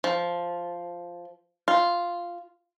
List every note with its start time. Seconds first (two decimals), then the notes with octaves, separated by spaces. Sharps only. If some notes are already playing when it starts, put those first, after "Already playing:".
0.04 F3
1.68 F4